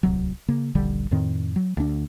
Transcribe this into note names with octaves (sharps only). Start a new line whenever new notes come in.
D1 C2 F#3
C#3 A#3
D#1 A#1 D3 G3
F2 A2 D#3 C4
F#3
D2 D4